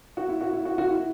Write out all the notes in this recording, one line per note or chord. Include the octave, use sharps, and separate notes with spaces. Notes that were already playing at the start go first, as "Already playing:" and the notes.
F#4
E4
F#4
E4
F#4
F#4
E4